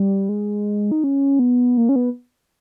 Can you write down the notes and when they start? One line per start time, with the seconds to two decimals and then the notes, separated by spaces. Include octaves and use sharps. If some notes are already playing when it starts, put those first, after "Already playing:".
Already playing: G3
0.29 G#3
0.91 D#4
1.04 C#4
1.39 B3
1.77 A#3
1.89 C#4
1.96 B3